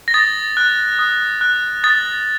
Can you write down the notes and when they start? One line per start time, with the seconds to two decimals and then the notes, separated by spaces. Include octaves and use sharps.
0.08 A#6
0.14 D#6 A6
0.57 F#6
0.99 D#6
1.41 F#6
1.84 D#6 A6